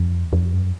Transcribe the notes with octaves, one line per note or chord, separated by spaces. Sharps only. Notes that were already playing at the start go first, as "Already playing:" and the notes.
Already playing: F2
E2
F2
F#2